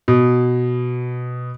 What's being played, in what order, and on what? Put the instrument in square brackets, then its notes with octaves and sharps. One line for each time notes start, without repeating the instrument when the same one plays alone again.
[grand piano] B2